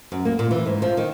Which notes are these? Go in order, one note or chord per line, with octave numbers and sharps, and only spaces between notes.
F#2
A#3
A#2
E3
G#2
F3
D#3